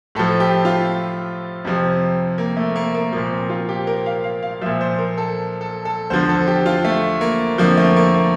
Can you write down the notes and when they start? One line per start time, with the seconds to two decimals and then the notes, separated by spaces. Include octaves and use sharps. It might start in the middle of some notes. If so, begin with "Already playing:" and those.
0.15 A2 F3 A4
0.40 G4
0.65 F4
1.65 F2 C3 F3
2.38 A#3
2.57 A3
2.76 A#3
2.95 A#3
3.12 A#2 F3 A#3
3.32 C4
3.50 F4
3.69 G4
3.87 A#4
4.06 F5
4.24 F5
4.43 F5
4.61 A#2 F3 E5
4.81 C5
4.99 A#4
5.18 A4
5.61 A4
5.85 A4
6.10 E2 D3 F3 C5
6.29 A4
6.47 G4
6.66 F4
6.85 A3
7.21 A#3
7.58 F2 D3 F3 A#3
7.77 A3
7.96 A#3
8.14 A#3